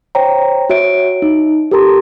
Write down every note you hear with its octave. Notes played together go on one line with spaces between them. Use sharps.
C5 C#5 G5 A#5
F#4 C#5 E5 D7
D#4
G4 A4 A#4 A5 A#5 C6